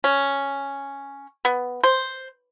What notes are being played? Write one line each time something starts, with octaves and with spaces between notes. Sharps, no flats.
C#4
B3
C5